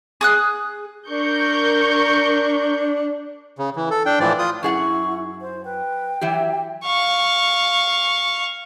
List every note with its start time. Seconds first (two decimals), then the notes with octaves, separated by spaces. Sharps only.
0.21 G#4 D#6 F#6
1.09 D4 A#4 C#6 G6
3.58 C#3
3.76 E3
3.90 A4
4.06 D4 G5
4.20 A2 E3 F3 D5
4.39 F4 D#6
4.63 F#2 E4 G#4 F#5 C#6
5.41 C5
5.65 B4 G5
6.21 E3 F#3 G4 E5
6.84 F5 C#6